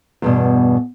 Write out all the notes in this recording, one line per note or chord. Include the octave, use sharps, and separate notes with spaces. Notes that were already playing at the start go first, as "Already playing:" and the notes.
E2 G2 B2